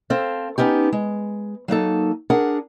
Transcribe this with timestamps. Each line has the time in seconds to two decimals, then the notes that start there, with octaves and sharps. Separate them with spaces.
0.10 C4 A4 F5
0.58 B3 C#4 D#4 G4
0.92 G#3
1.68 F#3 A#3 D#4 A4
2.30 D4 G#4 A#4 F#5